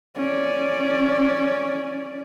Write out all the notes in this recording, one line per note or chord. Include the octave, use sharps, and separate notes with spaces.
C#4 D5